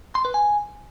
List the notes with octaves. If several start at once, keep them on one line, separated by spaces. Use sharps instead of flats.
C6
B4
G#5